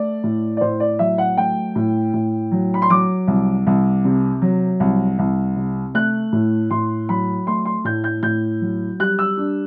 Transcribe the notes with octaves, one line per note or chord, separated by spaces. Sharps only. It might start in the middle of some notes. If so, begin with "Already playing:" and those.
Already playing: A3 D5
A2
D5
A2 C5
D5
F#3 E5
F#5
A3 G5
A2
A2
F#3
B5
C6
F#3 D6
C2
C2
C3
F#3
C2
C2
C3
A3 F#6
A2
A2 C6
F#3 B5
A3 C6
C6
A2 G6
G6
A2 G6
F#3
G3 F#6
E6
D4